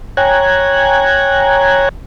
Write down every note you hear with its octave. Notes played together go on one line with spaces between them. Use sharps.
C#5 G5 G#5 A#5 F#6 G#6